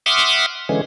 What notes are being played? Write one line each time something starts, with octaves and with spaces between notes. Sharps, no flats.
E5 F#5 C6 D6 D#6 F6
D3 E3 G#3 C#4